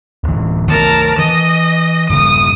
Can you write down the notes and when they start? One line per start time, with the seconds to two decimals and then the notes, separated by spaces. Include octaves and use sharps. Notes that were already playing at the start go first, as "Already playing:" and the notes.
0.24 D1 E3
0.69 D#3 A3 B3 A#4 A5
1.19 E3 D#5
2.10 G2 C#3 G3 D#6